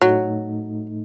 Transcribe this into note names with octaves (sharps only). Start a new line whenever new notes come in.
A2 F#3 A3 D#4